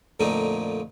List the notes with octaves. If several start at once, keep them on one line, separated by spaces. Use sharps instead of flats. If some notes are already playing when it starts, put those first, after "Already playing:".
F2 A#2 D3 A3 D#4